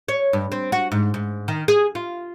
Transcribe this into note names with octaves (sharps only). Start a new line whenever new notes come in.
C#5
G2
C4
F#4
G#2
G#2
D#3
G#4
F4